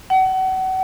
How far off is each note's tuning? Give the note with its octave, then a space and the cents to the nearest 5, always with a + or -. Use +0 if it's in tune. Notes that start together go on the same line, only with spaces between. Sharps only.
F#5 +35